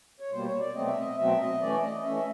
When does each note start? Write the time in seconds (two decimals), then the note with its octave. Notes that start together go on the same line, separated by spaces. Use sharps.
0.20 C#5
0.31 B2 G3 A#3 C5
0.46 C#5
0.59 D5
0.74 B2 F#3 A3 C4 D#5
0.87 E5
0.98 D#5
1.18 B2 F#3 A3 C4 E5
1.39 D#5
1.61 E3 A3 C#4 D5
1.83 D#5
2.04 E3 A3 C#4 E5